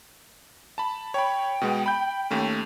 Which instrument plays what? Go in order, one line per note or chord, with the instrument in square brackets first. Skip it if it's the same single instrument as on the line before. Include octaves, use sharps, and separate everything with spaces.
[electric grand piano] A5 B5
[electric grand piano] C#5 B5 [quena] G5
[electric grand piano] B2 G#3 B3
B5 G6
D#2 A3 C#4